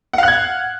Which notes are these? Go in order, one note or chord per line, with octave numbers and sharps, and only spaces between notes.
F5 F#5 F#6 G#6